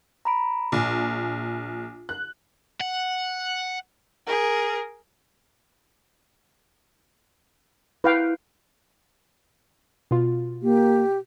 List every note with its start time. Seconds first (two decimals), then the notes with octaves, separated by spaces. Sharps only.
0.25 A#5 B5 D7
0.72 A#1 G#5 D6
2.09 F#6
2.81 F#5
4.27 G#4 A#4
8.04 E4 B4 F5 G5
10.11 B2 F4
10.63 A#3 G4